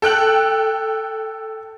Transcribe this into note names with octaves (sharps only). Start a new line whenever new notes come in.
A4 G5 F#6 F#7